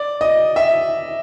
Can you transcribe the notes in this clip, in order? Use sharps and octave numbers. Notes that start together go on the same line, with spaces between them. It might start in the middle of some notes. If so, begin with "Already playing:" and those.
Already playing: D5
D#5
E5